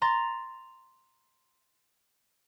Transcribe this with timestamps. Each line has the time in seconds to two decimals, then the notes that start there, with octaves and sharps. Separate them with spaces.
0.02 A#5 C6 A6